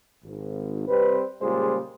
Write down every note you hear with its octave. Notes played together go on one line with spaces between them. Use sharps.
G#1
C3 G3 C4 B4
A#2 C#3 G3 G#3 F4 C5